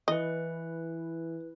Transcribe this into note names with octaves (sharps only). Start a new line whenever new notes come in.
E3 E4 B4 D#5